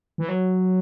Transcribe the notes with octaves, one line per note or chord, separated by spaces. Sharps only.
E3
F#3